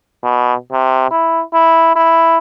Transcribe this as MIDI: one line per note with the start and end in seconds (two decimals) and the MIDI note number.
0.23 0.54 47
0.72 1.09 48
1.11 1.41 64
1.54 1.91 64
1.96 2.38 64